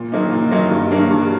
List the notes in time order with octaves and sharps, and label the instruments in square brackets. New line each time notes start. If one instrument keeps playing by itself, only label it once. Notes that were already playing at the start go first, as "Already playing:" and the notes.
Already playing: [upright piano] A#2
F#3 A#3 D#4
A#2
F#3 A#3 D#4
G2
F#3 A#3 D4
G2